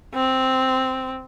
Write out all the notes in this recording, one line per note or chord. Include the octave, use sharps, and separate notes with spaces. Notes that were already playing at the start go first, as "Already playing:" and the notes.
C4